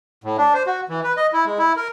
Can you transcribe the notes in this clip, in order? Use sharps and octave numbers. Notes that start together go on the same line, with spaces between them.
A2
D4
C5
F#4
E3
B4
D#5
E4
G#3
E4
A#4